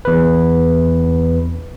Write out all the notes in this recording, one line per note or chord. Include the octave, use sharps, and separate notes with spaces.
E2 B4